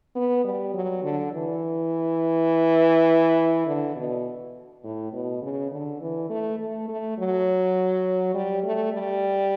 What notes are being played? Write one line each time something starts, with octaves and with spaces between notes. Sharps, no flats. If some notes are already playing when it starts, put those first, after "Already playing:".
B3
G3
F#3
D3
E3
D3
B2
A2
B2
C#3
D3
E3
A3
A3
A3
F#3
G3
A3
G3